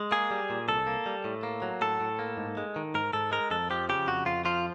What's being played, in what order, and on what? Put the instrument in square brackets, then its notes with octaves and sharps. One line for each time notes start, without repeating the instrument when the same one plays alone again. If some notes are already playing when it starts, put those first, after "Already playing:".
Already playing: [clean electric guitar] G#3
A#3 G#4
G3
A#2
C2 A4
A#3
G3
A2
A#3
F#3
A2 A4
A2
A#3
G#2
G#3
D#3
G#2 A#4
G#2 A4
G#3 A#4
F2 A4
F3 G4
C#3 G4
F2 F#4
F2 F4
F3 F4